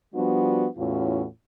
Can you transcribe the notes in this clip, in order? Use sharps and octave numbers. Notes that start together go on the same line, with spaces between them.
F3 G3 B3 D4 F#4
E2 A2 C#4 F4 F#4